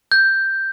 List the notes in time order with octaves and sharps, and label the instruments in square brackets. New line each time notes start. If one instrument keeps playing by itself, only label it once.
[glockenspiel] G6